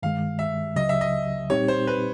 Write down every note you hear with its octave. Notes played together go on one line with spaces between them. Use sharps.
G2 D#3 G#3 F5
E5
C#2 C#3 F#3 D#5
E5
D#5
A#2 G3 C4 D#4 G4 C#5
C5
B4